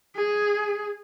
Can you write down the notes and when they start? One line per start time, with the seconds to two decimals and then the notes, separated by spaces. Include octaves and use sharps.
0.16 G#4